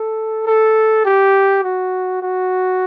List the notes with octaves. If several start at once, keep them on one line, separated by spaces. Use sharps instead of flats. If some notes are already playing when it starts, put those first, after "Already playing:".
Already playing: A4
A4
G4
F#4
F#4